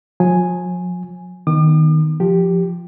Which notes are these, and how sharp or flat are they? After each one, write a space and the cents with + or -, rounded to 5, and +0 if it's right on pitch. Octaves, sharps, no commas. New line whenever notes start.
F3 +45 G#5 +0
D#3 +0 B3 +0 D6 +45
F3 +0 G4 +0